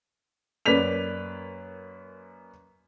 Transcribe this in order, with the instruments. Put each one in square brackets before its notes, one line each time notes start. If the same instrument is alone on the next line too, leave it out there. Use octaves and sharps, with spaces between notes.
[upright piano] F#2 A#3 B4 D5 B6 F7